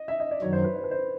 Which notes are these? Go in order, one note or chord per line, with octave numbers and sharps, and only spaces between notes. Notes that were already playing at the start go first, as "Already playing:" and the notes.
Already playing: D#5
E5
D#5
D5
F#2 D#3 F#3 C#5
C5
B4
C5
B4
C5